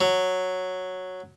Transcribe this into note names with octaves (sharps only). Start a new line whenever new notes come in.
F#3